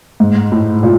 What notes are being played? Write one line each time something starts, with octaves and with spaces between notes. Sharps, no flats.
G#2
A2
A#2